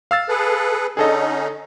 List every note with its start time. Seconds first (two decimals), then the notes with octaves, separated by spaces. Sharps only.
0.11 F5 E6 A6
0.29 G#4 A4 B4
0.97 D3 C#4 D#4 G#4 A4 D#5